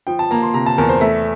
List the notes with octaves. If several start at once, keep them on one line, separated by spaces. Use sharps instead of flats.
F3 G5
A5
A#3 A#5
C6
C3 A#5
A5
E2 A#4
C5
A3 E5